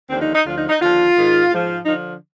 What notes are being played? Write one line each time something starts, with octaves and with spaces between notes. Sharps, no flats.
D#2 D3 F3 C4
D#4
D#4
D2 D3 F3 F4
D#4
D#4
D#2 D3 F3 F4
G#2 D#3
G#2 F3
D3 F3 D#4